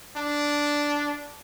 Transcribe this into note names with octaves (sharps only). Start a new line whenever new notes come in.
D4